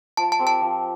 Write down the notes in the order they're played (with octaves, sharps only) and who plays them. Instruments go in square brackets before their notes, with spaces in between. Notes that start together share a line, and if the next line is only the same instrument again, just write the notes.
[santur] F3 [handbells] A5
[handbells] A5
[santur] C4 G4 A#4
[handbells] A5
[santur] F3